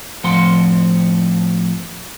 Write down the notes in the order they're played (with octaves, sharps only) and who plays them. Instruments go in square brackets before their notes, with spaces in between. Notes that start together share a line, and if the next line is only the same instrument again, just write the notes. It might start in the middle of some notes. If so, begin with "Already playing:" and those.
[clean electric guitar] A2 F3 C4 F#5 C6